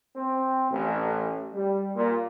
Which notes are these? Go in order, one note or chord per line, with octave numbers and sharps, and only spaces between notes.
C4
A1
G3
A#2